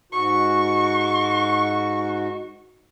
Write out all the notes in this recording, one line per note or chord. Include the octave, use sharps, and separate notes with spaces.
G#2 F#4 C#6